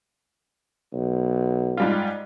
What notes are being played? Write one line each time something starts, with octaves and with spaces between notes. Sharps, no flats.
B1
G#2 G3 F4